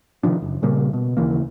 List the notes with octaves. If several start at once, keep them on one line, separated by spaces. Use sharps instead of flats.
C3 D#3 F3 D4
F#1
A#2 C#3 G3 A#3
B2
D#2 C#3 E3 A#3